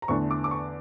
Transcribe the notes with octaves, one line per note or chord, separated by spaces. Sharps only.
A#5
E2 D3 A3 C#6
D6
D6
C#6